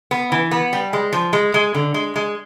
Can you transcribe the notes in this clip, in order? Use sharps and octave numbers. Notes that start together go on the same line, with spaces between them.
B3
E3
B3
G3
G#3
F3
G#3
G#3
D3
G#3
G#3